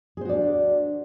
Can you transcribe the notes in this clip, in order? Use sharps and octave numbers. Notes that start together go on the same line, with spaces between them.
D4 F#4 G#4 C5 D5